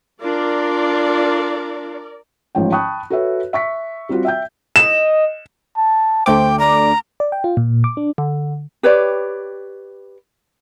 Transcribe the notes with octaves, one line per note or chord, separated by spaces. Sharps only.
D4 F4 A#4 D5
A1 G#2 F3 C#5 G5
G5 A5 B5 C#6 D#6 F#6
F#4 A4 B4 C#5 E5
E5 C#6 B6
G3 C4 F4 F#4
E5 G5 G6
D#5 E7
A5
D2 A3 C5 G5 D6
D5 A#5
D5
G5
F4
A#2
D6
D4
D3
G4 B4 C#5 D5